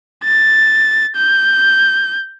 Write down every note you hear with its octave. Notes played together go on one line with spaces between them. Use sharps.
A6
G6